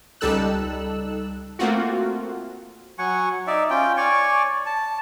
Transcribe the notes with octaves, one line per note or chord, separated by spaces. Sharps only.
C#2 G3 D#4 A4 E6 F#6
A3 A#3 C4 F4 F#4
F#3 F#5 G#5 C#6
D#4 D5 E5
C#4 F4 G5
C#5 D5 G#5 C#6
A5